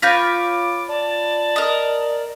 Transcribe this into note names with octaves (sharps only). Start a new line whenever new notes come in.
F4 B4 C#5 D6 G6 A#6 B6
D5 A5
A#4 D#5